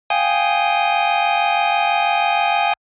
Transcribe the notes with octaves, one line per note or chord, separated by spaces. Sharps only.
F5 G5 G#5 D#6 G6